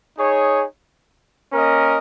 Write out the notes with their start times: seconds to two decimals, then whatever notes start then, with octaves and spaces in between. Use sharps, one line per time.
0.17 D#4 G#4 C#5
1.53 A#3 C#4 A#4 D#5